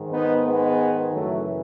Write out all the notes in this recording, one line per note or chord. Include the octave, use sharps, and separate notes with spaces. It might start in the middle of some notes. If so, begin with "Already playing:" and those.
Already playing: G#2 D#3
B3 D#4
G#3 B3
F#2 C#3 E3 F#3 A3